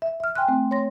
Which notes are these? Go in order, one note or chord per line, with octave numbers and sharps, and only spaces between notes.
E5
E5 F6
G5 G#5 C6 F6 F#6
A3 C4
C#5 C6 A#6